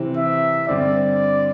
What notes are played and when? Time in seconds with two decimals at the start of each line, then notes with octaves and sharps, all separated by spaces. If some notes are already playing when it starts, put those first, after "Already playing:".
Already playing: C3 E3 C4 E4
0.17 E5
0.68 G2 D3 C4 D5